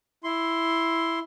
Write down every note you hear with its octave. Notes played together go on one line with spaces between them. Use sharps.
E4 C6